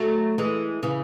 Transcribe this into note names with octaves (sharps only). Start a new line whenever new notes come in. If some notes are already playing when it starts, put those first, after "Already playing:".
Already playing: F#3 A3
E3 G#3
C#3 E3